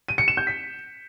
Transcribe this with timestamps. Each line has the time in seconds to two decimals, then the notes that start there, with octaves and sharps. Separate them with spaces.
0.08 D#7
0.18 C#7
0.28 E7
0.37 G6
0.47 B6